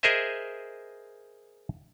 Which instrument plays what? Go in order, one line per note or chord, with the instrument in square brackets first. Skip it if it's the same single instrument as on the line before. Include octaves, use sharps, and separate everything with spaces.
[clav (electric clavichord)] G#4 A#4 C5 D#5 E5 G#5